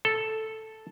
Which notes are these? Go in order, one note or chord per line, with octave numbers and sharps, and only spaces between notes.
A4